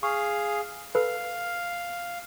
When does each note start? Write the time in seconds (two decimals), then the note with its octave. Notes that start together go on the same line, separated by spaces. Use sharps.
0.03 G#4 F5 C#6
0.95 A4 B4 F5